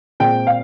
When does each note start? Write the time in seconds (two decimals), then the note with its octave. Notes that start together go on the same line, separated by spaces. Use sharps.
0.20 A#2 G#3 C4 G5
0.47 F5